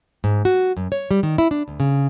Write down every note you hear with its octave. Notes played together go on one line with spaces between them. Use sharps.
G#2
F#4
F#2
C#5
G3
D#3
E4
D4
D2
C#3